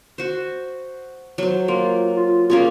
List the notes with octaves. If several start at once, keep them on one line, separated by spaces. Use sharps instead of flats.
F#4 C5
F#3 C5
A#3 F4
F4
A#3 C#4 F4 G#4